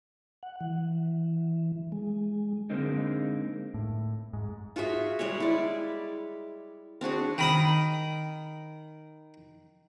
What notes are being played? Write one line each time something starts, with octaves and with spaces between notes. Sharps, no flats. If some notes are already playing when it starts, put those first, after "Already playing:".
F#5
E3
G#3
D3 G#3 A#3 C4 D#4
A2
G#2
F4 F#4 G#4 E5
G3 G#3 G#4 C#5
E4 D5
C4 D4 F#4 G#4
D#3 B5 D#6